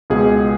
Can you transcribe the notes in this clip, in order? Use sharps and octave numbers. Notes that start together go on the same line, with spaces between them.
C#2 B2 G#3 G#4